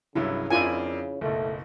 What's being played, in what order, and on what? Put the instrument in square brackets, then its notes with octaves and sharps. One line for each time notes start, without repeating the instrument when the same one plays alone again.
[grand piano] C2 G2 F#3 [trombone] C#3 [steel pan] E4
[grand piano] F2 D4 A#4 [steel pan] E4 F4 G#5
[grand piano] F#1 B1 [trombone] A3